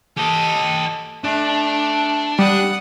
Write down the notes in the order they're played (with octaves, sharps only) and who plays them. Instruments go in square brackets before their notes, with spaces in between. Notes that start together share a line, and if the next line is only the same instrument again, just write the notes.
[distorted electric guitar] G4 D#5 [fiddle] A4
[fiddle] A3 [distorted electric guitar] D4
[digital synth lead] G3 [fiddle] F#5 D#6